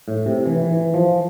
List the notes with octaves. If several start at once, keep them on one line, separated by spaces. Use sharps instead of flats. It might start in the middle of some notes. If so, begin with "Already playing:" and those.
A2
C3
E3
E3
F3